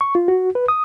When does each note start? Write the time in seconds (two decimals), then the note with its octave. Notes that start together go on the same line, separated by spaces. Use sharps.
0.01 C#6
0.15 F4
0.28 F#4
0.55 B4
0.68 D#6